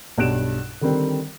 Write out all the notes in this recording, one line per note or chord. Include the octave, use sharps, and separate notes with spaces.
B1 G2 F#6 D7 E7
D3 D#3 G3 C4 A#4